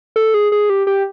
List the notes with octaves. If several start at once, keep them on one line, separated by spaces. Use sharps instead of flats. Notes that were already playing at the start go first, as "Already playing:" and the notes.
A4
G#4
G#4
G4
G4